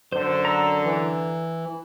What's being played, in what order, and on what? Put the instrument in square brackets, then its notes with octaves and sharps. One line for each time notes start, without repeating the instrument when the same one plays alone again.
[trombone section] F#2 D3 [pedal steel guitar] C5
[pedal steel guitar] A#5 E6
[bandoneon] E3